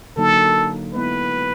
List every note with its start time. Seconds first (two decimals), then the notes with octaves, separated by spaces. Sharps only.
0.17 D3 F#3 A#3 D#4 A4
0.94 G#3 B3 E4 B4